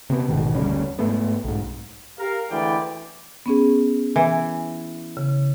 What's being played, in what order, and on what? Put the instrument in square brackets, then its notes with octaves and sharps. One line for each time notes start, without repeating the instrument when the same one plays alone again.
[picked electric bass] C3 B3
A1 G#2 B2 D#3
F#1 D2 G3 C#4
G#2 A3 B3
B1 G#2
[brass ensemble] G4 A#4 F5
D2 E3 G#3 E4 D5 G5
[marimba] B3 C#4 G#4
[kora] E3
[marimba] C#3